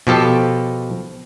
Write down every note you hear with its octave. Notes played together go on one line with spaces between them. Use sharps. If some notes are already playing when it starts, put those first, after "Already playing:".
B2 F3 G4 A4